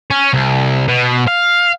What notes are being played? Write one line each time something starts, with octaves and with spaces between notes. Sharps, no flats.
C#4
C2
B2
F5